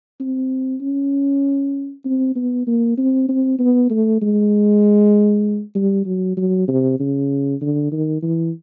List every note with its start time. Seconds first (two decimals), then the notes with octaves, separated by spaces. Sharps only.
0.20 C4
0.81 C#4
2.05 C4
2.36 B3
2.67 A#3
2.97 C4
3.28 C4
3.59 B3
3.90 A3
4.22 G#3
5.75 G3
6.06 F#3
6.37 F#3
6.68 C3
6.99 C#3
7.61 D3
7.92 D#3
8.22 E3